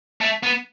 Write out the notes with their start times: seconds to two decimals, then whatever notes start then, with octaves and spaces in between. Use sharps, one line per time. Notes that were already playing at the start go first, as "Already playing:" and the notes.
0.21 A3
0.43 B3